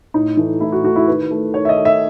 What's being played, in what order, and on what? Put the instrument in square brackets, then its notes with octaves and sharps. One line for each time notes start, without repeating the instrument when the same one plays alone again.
[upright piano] A2 D#4
E3 A3
A2 E4
F#4
E3 A3 F#4
E4
D#3 B4
A3
D#3 C#5
E5
D#5
A3
E5